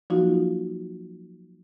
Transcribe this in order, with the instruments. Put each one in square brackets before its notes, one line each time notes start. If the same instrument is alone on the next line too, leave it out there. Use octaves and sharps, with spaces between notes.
[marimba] F3 F#3 A#3 D#4 F4 F#4